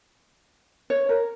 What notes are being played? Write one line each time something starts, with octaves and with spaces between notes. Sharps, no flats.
C#5
A#4